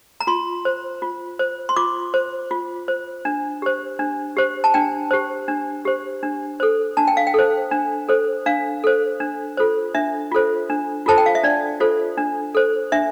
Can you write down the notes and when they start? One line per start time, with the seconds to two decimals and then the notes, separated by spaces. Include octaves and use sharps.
0.21 A#5
0.27 F4 C6
0.65 C5
1.02 F4
1.39 C5
1.69 C6
1.76 F4 D6
2.14 C5
2.51 F4
2.88 C5
3.25 D4
3.62 G4 C5
3.99 D4
4.37 G4 C5
4.64 A5
4.74 D4 G5
5.11 G4 C5
5.48 D4
5.85 G4 C5
6.23 D4
6.60 A4 C5
6.97 D4 A5
7.07 G5
7.17 F5
7.27 G5
7.34 A4 C5
7.71 D4
8.09 A4 C5
8.46 D4 F5
8.84 A4 C5
9.20 D4
9.57 F4 A4 C5
9.95 D4 E5
10.32 F4 A4 C5
10.70 D4
11.06 F4 A4 C5 A5
11.18 G5
11.26 F5
11.35 E5
11.43 D4 D5
11.80 F4 A4 C5
12.18 D4
12.55 A4 C5
12.92 D4 E5